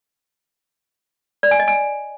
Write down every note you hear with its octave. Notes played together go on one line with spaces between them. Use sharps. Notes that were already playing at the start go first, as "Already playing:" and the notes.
D5
G#5
D#5
G#5